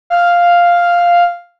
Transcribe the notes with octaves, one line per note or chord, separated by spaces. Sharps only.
F5